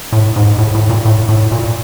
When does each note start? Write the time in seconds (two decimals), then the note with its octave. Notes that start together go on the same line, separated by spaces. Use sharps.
0.13 A2
0.36 G#2
0.58 A2
0.75 A2
0.90 A#2
1.05 A2
1.29 A2
1.52 A#2